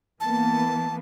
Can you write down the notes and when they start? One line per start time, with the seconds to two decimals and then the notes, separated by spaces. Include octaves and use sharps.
0.20 E3 A#3 B3 A5